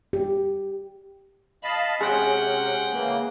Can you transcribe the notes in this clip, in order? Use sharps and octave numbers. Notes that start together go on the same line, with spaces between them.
G4
D#5 F5 A5 B5
C3 G#3 C#4 F#5 G5
C#3 E3 A#3